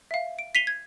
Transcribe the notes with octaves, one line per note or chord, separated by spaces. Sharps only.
E5 F5
D7
B6 C7 D#7 F7 G7
G#6